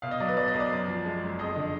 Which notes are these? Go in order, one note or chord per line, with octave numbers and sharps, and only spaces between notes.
B2 F5
D#5
F#3 D5
B4
B1 D5
D#5
B1
D5
F#2
F3
G#3
F#1
F2 D#5
D3